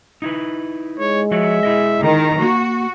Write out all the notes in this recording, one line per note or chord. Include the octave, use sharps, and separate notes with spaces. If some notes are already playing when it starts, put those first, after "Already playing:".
D#4 E4 B4
G#3 C#5
F3 F#4 C#5 E5
E4 G#4 D#5
D#3 A#5
A#3 F#4